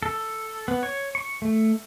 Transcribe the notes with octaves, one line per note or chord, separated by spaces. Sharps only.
A4
B3
C#5
C#6
A3